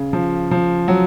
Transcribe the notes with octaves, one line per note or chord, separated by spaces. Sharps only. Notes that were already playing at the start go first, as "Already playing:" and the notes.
Already playing: C#3
F3
F3
F#3